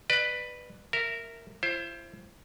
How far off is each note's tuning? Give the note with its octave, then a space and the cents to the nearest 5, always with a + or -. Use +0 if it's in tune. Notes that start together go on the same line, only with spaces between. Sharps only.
B4 +0 D5 +30
A#4 -10 E5 +0
E4 +45 C5 +15